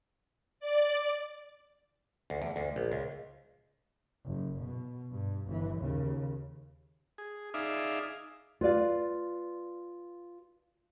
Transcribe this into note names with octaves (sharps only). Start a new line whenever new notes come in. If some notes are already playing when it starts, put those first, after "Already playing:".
D5
D2
E2
D2
A#1
C#2
F#1
B2
G2
G1 E3
D#2 C#3
G#4
D#4 G#4 D5 E5 F5
F4 B4 D5 F5